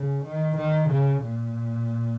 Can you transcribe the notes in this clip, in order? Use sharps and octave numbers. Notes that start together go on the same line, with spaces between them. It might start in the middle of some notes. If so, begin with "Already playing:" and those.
Already playing: C#3
D#3
D#3
C#3
A#2